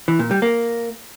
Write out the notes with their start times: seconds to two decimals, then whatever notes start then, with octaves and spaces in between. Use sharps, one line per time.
0.08 E3
0.19 A#2
0.31 G3
0.42 A#3